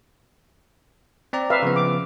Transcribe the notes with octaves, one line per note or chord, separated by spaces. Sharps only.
C4 D5 A#5
B4 E5 F5
C#3 F3 B3
D6